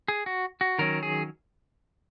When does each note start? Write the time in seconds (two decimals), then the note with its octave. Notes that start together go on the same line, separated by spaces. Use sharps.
0.08 G#4
0.26 F#4
0.61 F#4
0.78 D#3 F#3 C#4 A#4
1.03 G#4